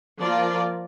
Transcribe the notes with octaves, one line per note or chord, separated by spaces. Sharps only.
F3 A#3 F4 A#4 D5